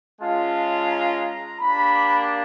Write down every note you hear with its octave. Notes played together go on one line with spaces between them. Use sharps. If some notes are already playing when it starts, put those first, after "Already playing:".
G#3 C#4 F4 A5
A#5
A#3 D4 G4 B5